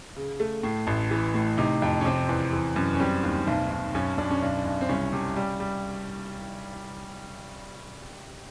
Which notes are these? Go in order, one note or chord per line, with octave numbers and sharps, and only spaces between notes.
C#3
A3
A2
A1
E3
A2
C3 D#4
F2
C#4
C3 C4
E2
E3
F#2
C#4
G3 C4
D#2
B1
B1
F#2 C#4
F#2 D4
C#4
B1 D4
B1
C4
C2 C#4
C3
G3
G3